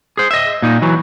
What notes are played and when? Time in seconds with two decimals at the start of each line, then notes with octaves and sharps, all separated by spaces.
0.17 G#4 C5
0.31 D#5 E5
0.62 A#2 D#4
0.82 E3 F#3